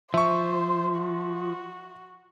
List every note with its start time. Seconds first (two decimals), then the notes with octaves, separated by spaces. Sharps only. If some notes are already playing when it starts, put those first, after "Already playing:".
0.14 F3 C5 E5 C#6
0.97 F#4